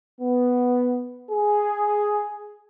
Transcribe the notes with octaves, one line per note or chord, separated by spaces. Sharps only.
B3
G#4